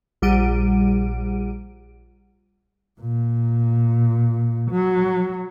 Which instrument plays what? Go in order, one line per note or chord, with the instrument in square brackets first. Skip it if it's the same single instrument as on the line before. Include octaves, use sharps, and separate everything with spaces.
[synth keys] A#1 G3 F#5 D7 D#7
[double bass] A#2
F#3